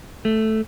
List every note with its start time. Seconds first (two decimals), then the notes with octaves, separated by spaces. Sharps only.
0.25 A3